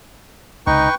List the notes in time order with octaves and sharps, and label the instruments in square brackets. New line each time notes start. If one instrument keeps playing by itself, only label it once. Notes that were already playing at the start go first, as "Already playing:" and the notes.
[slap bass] C#2 C3 [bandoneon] D#4 [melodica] B4 G5 C#6